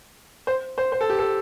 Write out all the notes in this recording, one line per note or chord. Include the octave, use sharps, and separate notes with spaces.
C5
C5
C5
A4
G4
A4